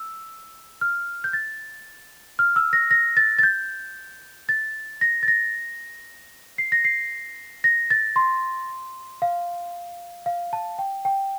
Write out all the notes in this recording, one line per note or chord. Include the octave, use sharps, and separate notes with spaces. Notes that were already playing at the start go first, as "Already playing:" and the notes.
Already playing: E6
F6
G6
A6
F6
E6
A#6
A#6
A6
A6
G6
A6
A#6
A6
A#6
C7
A#6
C7
A#6
A6
C6
F5
F5
A5
G5
G5